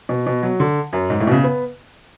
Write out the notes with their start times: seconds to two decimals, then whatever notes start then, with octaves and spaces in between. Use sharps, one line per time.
0.09 B2
0.27 B2
0.42 F#3
0.60 D3
0.93 F#2
1.10 G#2
1.20 A2
1.27 B2
1.31 C#3
1.44 B3